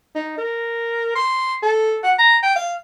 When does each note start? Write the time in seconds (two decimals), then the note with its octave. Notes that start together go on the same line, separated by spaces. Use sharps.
0.15 D#4
0.38 A#4
1.16 C6
1.62 A4
2.04 F#5
2.18 A#5
2.43 G5
2.56 F5